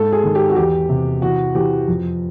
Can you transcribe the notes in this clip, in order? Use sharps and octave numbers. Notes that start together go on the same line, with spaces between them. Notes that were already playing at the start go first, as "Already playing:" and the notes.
Already playing: G#2 A4
G#4
D#3
G4
F#4
E2 G4
C3
E3 F#4
E3 G4
F2